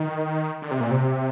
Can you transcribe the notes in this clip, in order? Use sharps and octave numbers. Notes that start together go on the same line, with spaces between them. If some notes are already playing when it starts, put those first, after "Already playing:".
Already playing: D#3
D3
C3
A#2
C3